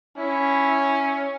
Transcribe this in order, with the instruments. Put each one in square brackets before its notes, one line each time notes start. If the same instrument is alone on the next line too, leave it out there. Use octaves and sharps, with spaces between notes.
[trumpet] C#4 [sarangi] E4